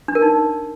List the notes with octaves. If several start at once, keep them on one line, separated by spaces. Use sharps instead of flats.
D4
A#4
D#4